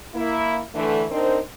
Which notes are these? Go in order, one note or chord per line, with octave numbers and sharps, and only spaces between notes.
A#3 E4
D3 E3 A3
C4 D4 D#4 A#4 C5